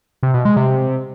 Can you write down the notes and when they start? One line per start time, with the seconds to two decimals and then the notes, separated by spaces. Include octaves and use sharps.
0.23 C3
0.34 B2
0.45 G#3
0.56 C3